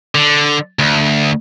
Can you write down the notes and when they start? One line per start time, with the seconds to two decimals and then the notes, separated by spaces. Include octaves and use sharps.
0.15 D3
0.79 D2